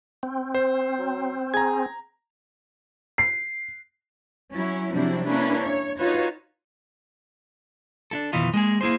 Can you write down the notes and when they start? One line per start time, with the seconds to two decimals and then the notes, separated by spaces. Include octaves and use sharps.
0.23 C4
0.55 C5
0.99 F#3
1.54 G#4 A#5 G#6
3.18 C7
4.51 F#3 C#4 E4
4.91 C3 F3 F#3 C4 D4 E4
5.27 A#3 C#4 D4 E4 B4
5.61 C#5
5.98 D#4 F4 F#4 B4 C#5
8.11 D4 E4 A4
8.33 F2 B2 D#3 E3 D#4 F4
8.54 G#3 A#3 G#4
8.81 A#3 E4 G#4 C5